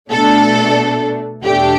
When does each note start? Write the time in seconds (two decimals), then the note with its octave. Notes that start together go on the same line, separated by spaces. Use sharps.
0.11 B2 A3 D4 A4
1.43 E2 B2 A3 D4 G4